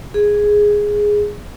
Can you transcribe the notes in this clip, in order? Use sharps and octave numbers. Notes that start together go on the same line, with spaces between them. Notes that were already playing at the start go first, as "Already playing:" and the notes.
G#4